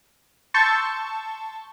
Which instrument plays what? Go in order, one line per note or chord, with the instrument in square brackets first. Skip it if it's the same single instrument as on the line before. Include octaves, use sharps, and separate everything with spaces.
[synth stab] A5 C6 C#6 E6 G6 A6